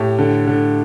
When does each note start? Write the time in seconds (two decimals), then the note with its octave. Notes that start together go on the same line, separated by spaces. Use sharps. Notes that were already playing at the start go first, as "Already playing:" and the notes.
Already playing: A2 G4
0.18 D3
0.47 D3